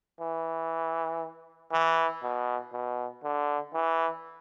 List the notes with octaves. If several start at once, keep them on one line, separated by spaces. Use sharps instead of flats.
E3
E3
B2
B2
D3
E3